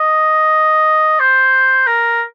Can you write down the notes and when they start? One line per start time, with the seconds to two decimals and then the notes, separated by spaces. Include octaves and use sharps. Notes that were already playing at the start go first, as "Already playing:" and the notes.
Already playing: D#5
1.20 C5
1.87 A#4